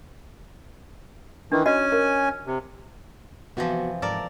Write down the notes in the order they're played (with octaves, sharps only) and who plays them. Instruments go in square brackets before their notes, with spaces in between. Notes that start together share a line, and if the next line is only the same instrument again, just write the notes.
[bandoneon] D#3 E3 [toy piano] D4
[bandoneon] C#4 G#5 [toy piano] F#4 D#5
[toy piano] A#4
[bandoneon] C3
[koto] C3 E3 F3 [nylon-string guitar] B3 F#4
[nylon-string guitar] G#2 [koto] A4 A#4 D5